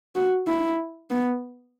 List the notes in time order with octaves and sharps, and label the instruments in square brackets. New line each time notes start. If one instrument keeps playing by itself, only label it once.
[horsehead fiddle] F#4
E4
B3